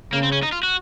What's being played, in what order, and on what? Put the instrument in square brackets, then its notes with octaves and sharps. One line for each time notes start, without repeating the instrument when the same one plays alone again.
[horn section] C#3 [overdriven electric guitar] A#3
[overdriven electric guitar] C4
C#4
D#4
F4
F#4